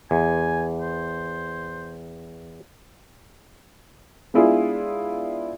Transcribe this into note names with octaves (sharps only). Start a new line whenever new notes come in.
E2 G#5
C5
G#3 B3 D4 E4 F4 G#4